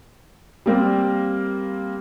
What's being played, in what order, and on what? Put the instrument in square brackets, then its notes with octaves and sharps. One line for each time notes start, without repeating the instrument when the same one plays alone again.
[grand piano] G3 A#3 C4